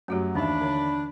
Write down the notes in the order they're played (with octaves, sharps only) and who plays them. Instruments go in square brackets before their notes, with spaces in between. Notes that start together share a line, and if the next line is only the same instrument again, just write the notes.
[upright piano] F#2 F#3 [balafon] A3 F#4 G4
[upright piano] D#2 E5 [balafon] E3 C#4 [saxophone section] D4 [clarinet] B5
[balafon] D3 C#5